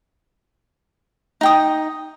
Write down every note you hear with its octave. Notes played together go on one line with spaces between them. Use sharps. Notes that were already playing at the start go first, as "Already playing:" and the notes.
D#4 G5 D#6